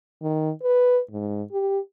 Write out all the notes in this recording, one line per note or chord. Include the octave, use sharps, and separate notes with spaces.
D#3
B4
G#2
G4